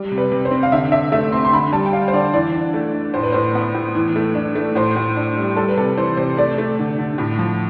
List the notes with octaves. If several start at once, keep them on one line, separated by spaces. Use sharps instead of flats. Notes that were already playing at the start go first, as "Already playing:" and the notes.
Already playing: G3
C3
B4
C3
C5
C4
F5
D3 E5
D3 E5
A3 E5
C4 C6
C6
D3 B5
G3 A5
G5
G3 F5
C5
D3 D5
E3 D5
D4
A3
D4
A2 C5
B4
A2 C5
B3
A2
E3
A3
D4
A3
A2 C5
A2
D4
G3
G3 A4
B4
C3 A4
E3 C5
C3 C5
A3 D5
A3
D3
D3
A2
F3